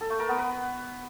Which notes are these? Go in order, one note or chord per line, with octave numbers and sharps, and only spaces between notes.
A4
A3
A#4
B3
B4